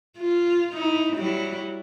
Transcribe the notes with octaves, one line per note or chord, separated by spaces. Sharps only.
F4
D#4 E4
F#3 G3 E4